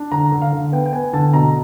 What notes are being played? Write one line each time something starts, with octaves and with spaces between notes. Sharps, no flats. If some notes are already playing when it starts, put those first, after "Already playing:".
Already playing: D4
D3 A#5
D3
F5
D3
B3 G5
G5
B3 G#5
D3 A5
B2 A#5